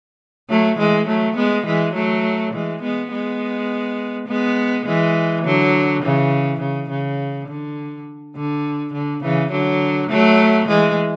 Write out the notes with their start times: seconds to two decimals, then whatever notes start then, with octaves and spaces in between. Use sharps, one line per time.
0.49 F#3 A3
0.78 E3 G#3
1.07 F#3 A3
1.36 G#3 B3
1.66 E3 G#3
1.94 F#3 A3
2.53 E3 G#3
2.82 G#3 B3
3.11 G#3 B3
4.27 G#3 B3
4.86 E3 G#3
5.44 D3 F#3
6.03 C#3 E3
6.60 C#3
6.89 C#3
7.48 D3
8.35 D3
8.93 D3
9.22 C#3 E3
9.51 D3 F#3
10.10 F#3 A3
10.68 E3 G#3